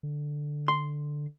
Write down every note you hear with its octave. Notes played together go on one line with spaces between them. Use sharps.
D3
C6